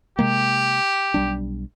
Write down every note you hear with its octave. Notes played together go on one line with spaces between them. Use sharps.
C3 G#3 A#3 G4
B1 G3 D4